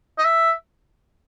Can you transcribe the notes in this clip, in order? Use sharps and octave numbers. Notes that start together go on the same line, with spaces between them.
D#5
E5